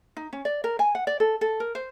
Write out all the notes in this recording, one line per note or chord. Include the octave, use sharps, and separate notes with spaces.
D#4
C#4
D5
A#4
G#5
F#5
D5
A4
A4
A#4
C5